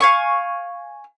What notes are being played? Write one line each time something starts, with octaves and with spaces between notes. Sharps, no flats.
F5 G#5 C#6